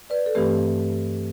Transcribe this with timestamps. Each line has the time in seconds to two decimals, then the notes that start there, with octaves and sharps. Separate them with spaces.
0.10 B4 D5
0.26 A4
0.35 G2 E3 A3 C4 G4 B4